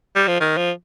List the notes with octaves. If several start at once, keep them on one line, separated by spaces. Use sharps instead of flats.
G3
F3
D#3
F3